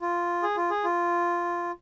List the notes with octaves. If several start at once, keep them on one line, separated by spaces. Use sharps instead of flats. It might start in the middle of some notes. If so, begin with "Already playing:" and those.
F4
G#4
F4
G#4
F4